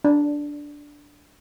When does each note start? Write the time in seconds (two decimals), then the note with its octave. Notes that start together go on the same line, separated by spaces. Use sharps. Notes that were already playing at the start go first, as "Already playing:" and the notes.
0.04 D4